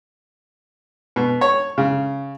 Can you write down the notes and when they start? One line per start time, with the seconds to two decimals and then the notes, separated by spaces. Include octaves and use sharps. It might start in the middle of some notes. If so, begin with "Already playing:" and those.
1.16 B2
1.41 C#5
1.78 C#3